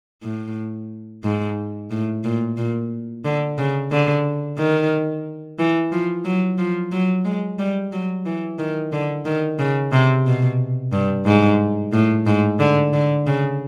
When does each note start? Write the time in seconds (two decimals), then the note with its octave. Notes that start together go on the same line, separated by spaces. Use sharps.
0.24 A2
1.24 G#2
1.91 A2
2.24 A#2
2.57 A#2
3.25 D3
3.58 C#3
3.91 D3
4.58 D#3
5.59 E3
5.92 F3
6.25 F#3
6.58 F3
6.92 F#3
7.25 G#3
7.59 G3
7.92 F#3
8.26 E3
8.59 D#3
8.92 D3
9.26 D#3
9.59 C#3
9.92 C3
10.26 B2
10.93 G2
11.26 G#2
11.93 A2
12.27 G#2
12.60 D3
12.93 D3
13.27 C#3